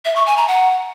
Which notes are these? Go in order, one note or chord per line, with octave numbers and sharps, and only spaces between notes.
E5
C#6
G#5
A#5
F#5